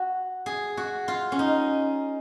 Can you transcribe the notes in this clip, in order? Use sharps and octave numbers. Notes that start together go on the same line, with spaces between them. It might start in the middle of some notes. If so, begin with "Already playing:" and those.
Already playing: F#4
G#4
F#4
F4
C#4
D#4